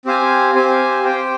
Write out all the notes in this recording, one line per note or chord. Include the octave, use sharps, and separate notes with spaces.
C4 G4 C5 F5 G#5
C4 G4 C5 F5 G#5
G4 C5 G5